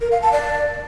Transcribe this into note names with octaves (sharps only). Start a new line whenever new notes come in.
A#4
F5
A5
D5